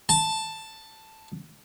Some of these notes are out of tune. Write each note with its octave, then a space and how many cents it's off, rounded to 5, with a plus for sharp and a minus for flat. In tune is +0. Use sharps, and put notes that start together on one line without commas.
A5 +5